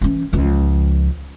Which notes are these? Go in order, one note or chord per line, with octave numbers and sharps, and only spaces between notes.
E3 C#4
C#2 F3